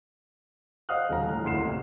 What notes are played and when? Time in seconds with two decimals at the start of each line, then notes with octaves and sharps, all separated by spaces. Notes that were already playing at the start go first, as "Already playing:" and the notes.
0.89 C5 D#5 F5 D#6 F6 F#6
1.09 D#1 D3 F3 F5 A#5
1.27 A2 F6
1.44 F#1 D2 C6 C7 E7
1.59 A1 C3